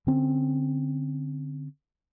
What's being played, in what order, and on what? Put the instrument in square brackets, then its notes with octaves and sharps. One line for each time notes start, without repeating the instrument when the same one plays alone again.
[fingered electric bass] D3 C4 C#4